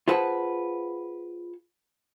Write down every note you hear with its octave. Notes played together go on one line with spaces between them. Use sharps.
F4 G#4 B4 C5 F#5 A5